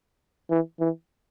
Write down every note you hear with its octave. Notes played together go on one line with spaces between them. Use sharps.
E3
E3